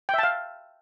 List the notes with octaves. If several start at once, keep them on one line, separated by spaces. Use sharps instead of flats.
E5 F5 G5 A5